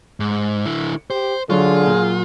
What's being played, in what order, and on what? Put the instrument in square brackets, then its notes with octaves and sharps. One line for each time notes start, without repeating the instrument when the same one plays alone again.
[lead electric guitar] G#2
D3 E4
[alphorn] G4 [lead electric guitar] C5
[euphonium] D3 [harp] F#3 F#4 C6 [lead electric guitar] F4 [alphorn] G#4
[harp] A#2